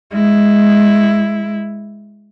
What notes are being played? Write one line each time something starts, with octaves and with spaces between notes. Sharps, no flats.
G#3 E4